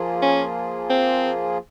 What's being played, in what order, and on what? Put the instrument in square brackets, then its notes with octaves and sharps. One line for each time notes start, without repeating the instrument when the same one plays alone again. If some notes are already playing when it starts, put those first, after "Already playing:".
Already playing: [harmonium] F3 A#3 F4 G#4
[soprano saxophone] C#4
C4